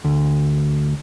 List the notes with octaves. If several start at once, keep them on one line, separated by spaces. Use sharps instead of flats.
D2